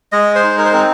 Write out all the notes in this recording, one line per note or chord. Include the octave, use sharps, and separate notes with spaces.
G#3 D#5
C5
D#4
A#4
C5
C4 A#4